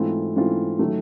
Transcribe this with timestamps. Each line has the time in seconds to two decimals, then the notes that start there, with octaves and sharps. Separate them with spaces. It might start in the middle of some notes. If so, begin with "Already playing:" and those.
Already playing: G#2 E3 A3 C4 F4
0.36 G#2 E3 A3 C4 F4
0.79 D#3 F#3 A3